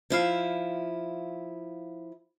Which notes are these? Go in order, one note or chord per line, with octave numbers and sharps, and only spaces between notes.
F3 E4 F5